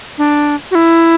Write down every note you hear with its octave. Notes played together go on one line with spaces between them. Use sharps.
D4
F#4
E4